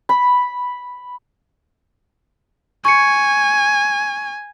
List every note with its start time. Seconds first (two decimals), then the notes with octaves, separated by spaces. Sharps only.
0.09 B5
2.85 G#5 C#6 G#6 C#7